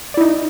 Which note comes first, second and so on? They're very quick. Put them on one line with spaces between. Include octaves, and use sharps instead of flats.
D5 E4 D#4